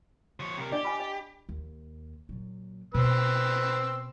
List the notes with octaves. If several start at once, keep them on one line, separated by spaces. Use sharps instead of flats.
F3 C#5
C3 A#4
D4 G4 D5 D#5
D#5 G#5 B5
D#5
D#2
A#2 F#3
B2 C4 B4 E6